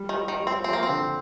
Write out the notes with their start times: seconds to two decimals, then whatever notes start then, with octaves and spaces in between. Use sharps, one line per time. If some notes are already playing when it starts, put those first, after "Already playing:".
Already playing: G3
0.09 D#3
0.16 G3
0.28 D#3
0.40 G3
0.47 C4
0.64 F3 C4
0.73 A#3
0.83 C4
0.89 D3